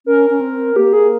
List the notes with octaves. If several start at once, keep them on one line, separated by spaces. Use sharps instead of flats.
C#4 A#4
C#4
C4
A#3 G4
G#4